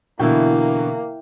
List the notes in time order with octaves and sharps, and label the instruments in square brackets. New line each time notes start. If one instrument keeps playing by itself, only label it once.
[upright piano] B2 D3 E3 [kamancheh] A#3 [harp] E4 G5